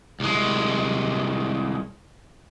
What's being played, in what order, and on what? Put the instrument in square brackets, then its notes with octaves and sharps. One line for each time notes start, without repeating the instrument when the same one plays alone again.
[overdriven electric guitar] C2 G#3